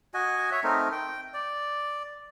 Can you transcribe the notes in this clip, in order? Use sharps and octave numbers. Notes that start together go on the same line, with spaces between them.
F#4 D#5 G#5
C#5 E5
A3 C4 D#4 A#4
G5
D5